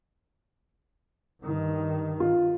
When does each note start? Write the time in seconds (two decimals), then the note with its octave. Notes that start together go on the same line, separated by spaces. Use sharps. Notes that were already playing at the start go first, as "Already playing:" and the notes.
1.42 G2 D#3
2.20 F4